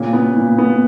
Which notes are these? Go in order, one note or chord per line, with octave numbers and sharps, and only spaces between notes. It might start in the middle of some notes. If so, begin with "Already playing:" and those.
Already playing: A#2 C#3
B3
A#2
B3